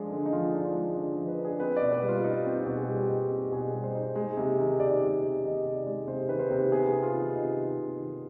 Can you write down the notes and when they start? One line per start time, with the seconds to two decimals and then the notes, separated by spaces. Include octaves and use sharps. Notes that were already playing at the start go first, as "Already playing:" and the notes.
Already playing: F3 G#3 D4
0.11 D3
0.26 D#4
0.33 F3 F4
0.54 D4
0.64 F4
0.75 G#3
0.96 D3 D5
1.13 F3 C5
1.28 B4
1.39 D4
1.45 G#4
1.60 C4 B4
1.77 B2 D5
1.92 B4
2.03 G3
2.08 F4
2.24 D#4
2.46 C4
2.56 F4
2.66 B2
2.77 G#4
2.88 G3 G4
3.09 D#4
3.30 C4
3.52 B2 G#4
3.74 G3
3.84 C5
3.95 D#4
4.15 G#3
4.37 C3
4.59 D#3
4.80 C3 D5
5.02 G#3
5.22 C3
5.43 D#3 D#5
5.65 C3
5.75 D5
5.87 G#3
6.07 C3 C5
6.29 D#3 B4
6.39 C5
6.50 C3
6.72 B3 G#4
6.92 C3
7.03 F4
7.15 D#3
7.35 C3 D#4
7.56 B3
7.78 C3
7.99 D#3